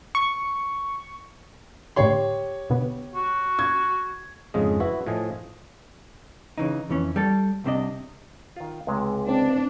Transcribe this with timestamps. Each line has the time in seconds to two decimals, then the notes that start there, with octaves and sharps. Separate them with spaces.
0.15 C#6
1.96 A2 D3 G4 C#5 C6
2.70 B2 D3 B3
3.15 F#4
3.59 G#6
4.54 F2 G#2 C#3 G#3 D#5
4.80 E4 F#4 B4
5.07 A2 F3 D#5 G#5
6.58 C#3 E3 D#4
6.89 F2 E3 C#4
7.16 G3 A4
7.64 C2 C3 D4 D#5
8.56 D#3 F4
8.87 C#2 C3 G#3
9.29 C4 D4